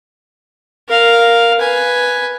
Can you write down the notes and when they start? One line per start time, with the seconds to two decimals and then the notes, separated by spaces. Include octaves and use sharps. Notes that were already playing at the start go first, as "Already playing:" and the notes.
0.89 A#4 F5
1.59 B4 G#5